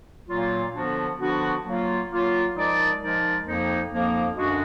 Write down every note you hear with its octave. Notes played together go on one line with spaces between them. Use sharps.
A#2 F#3 A#3 F4
D3 F3 B3 D4 F#4
D3 F3 B3 D4 F#4
F#3 A#3 F4
F#3 A#3 F4
F3 G#3 D#4 A#4 D5
F3 G#3 D#4 A#4 D5
F2 F3 A#3 D#4
F2 F3 A#3 D#4
F#2 D3 G#3 D4 F#4